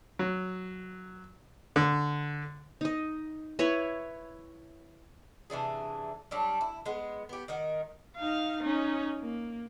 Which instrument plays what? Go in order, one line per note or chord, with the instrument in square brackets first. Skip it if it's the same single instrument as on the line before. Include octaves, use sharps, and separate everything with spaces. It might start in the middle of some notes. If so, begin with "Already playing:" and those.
[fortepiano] F#3
D3
[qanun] D#4 D#5
E4 B4 C#5
[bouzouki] C3 E3 D4 G#4
F#3 G3 D4
E4
G#3 B3
B3 G4
D#3 D#4 A#4 F#5
[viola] D#4 F5
C#4 D#4
A#3